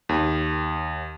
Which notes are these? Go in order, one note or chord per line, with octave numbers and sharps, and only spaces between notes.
D#2